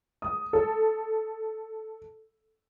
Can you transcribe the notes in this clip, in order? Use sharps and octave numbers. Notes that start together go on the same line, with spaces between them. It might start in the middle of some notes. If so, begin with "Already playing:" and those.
D#6
A4